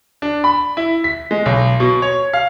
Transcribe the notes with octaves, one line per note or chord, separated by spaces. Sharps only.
D4
B5
E4
B6
G#3
B1
B2
C#5
F5